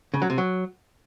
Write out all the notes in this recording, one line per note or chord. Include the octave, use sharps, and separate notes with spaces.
C#3
F#3
C3
F#3